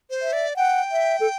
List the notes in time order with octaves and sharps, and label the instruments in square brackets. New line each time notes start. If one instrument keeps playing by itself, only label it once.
[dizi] C5
[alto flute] E5
[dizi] D5
[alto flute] F#5 [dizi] G5
[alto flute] E5
A4